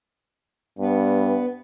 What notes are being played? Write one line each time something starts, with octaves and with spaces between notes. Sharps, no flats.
G2 B3